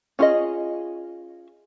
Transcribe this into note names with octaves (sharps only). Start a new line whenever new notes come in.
C#4 F4 G#4 C5 D#5